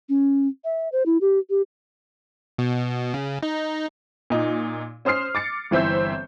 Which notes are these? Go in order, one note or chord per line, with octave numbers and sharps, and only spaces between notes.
C#4
E5
C5
E4
G4
G4
B2
C#3
D#4
A#2 D#4
C#4 C5 D#6 F6 C7
D6 A6 C#7
G1 E3 C4 E5 G6